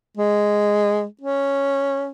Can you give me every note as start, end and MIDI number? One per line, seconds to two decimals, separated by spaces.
0.17 1.05 56
1.21 2.09 61